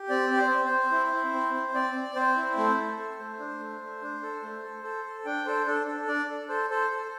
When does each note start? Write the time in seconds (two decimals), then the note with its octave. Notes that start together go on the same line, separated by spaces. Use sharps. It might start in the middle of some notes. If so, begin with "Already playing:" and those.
Already playing: G4
0.09 C4 D5
0.31 C4
0.37 C5
0.51 C4
0.65 C5
0.71 C4
0.92 E4
1.13 E4
1.34 C4
1.54 C4
1.74 C4 D5
1.95 C4
2.16 C4 C5
2.37 E4
2.57 A3 C5
2.78 A4
2.98 A4
3.20 A3
3.39 D4
3.60 A3
3.80 A3
4.02 D4
4.22 A4
4.43 A3
4.63 A4
4.83 A4
5.05 A4
5.25 D4 G5
5.46 A4 C5
5.66 D4 A4
5.87 D4 A4
6.08 D4 D5
6.28 A4
6.49 A4 C5
6.70 A4 C5
6.91 A4